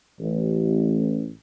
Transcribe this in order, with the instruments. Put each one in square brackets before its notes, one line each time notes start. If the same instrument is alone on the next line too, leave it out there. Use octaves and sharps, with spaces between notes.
[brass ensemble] A1